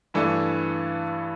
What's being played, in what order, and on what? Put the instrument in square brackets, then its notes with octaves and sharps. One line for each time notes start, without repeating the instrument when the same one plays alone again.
[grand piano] G2 E3 A3 D4 A4